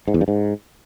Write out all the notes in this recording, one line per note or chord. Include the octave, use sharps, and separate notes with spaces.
G#2
E2
G2
G#2